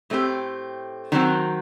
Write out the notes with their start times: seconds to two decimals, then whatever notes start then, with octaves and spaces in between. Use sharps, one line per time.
0.10 A2 A3 C4 G4
1.12 D#3 F#3 C4 F#4